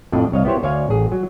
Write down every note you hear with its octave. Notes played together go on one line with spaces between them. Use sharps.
F2 A2 D4 D5 D#5
C2 C#5 D#5 F5
B3 E4 G4 C5 C#5
D2 C#5 D5 F5 G#5
A1 G#4
F#3